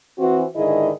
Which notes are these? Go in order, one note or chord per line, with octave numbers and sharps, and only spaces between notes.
E3 C4 F#4
G#2 D3 D#3 E4 G#4 D#5